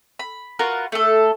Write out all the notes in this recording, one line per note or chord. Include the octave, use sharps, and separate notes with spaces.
B5
F4 F#4 A#4 B4
A3 A4